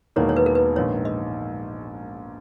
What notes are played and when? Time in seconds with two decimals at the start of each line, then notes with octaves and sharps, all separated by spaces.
0.16 E1 E2 D#3 A#3 C#5
0.29 C#5
0.36 B4
0.46 A#4
0.55 B4
0.75 A#1 G#2 D#3 C#5
1.05 D#5